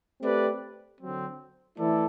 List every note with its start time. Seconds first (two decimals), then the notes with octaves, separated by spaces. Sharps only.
0.22 A3 C4 G4 B4 D5
0.99 D3 F#3 C4
1.78 E3 A3 E4 A4 D5